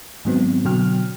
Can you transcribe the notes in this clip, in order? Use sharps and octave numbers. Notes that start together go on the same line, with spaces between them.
G#2 D#3 F#3 B3 C4
B2 D3 F#3 G5 F6